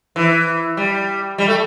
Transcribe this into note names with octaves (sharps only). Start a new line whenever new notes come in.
E3
G3
G3
A3